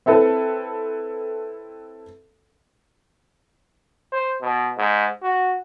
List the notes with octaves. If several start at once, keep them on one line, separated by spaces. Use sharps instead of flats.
C4 E4 A4 B4
C5
B2
G#2
F#4